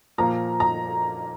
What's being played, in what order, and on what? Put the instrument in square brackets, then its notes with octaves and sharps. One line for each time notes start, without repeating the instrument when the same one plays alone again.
[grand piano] A#2 F3 A#3 [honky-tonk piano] A#5
[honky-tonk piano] A#5